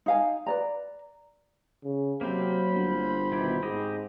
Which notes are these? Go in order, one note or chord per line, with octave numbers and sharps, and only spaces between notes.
D#4 F5 G#5
B4 D5 A#5
C#3
C3 F#3 A#3 C4 C5 B5
G1
B2 D#3 E4 G4
G#2 C4 G4 D#5